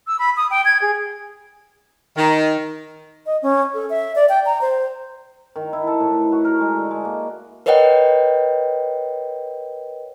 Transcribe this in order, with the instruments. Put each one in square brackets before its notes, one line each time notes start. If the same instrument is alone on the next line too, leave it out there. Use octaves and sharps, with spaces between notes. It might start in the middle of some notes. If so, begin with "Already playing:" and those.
[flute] E6
B5
D#6
G5
G#6
G#4
[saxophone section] D#3
[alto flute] D#5
C#4
A4
E5
D5
G5
A#5
C5
[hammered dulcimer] D#3
E4
A4
A2
B4
F#4
A#4
G#3
D3
G#3
A#3
[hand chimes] A#4 B4 C#5 D#5 F#5 G5